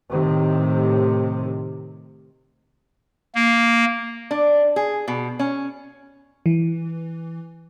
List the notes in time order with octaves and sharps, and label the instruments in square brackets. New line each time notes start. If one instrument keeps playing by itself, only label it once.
[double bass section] A2 C3 D#3
[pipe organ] A#3
[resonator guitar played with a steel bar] D4
G#4
B2
C#4
[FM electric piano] E3